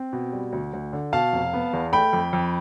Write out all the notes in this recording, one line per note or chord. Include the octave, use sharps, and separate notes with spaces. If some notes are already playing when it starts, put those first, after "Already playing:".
Already playing: C4
B2
G3
D2
D2
D3
B2 F5 A5
F1
B3
E2
A3 G5 B5
F2
F2